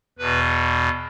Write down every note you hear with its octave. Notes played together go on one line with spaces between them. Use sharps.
E2 B2 B4